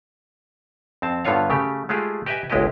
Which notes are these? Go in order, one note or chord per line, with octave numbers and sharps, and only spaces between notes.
F2 C4 A5
G2 D3 B3 F4 C#5 F5
C#3 A3 G4
G#3 A3 F4 G4 G#4
G4 B4 D#5 E5 G5 G#5
G1 C#2 G#3 E4 G4 D#5